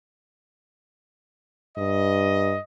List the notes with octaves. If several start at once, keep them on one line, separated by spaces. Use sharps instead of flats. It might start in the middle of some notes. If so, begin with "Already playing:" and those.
G2 D#5